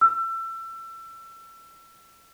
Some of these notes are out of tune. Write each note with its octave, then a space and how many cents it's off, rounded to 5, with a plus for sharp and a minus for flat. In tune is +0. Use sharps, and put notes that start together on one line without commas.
E6 +30